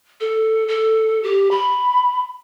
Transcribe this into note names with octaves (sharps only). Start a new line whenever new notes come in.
A4
A4
G4
B5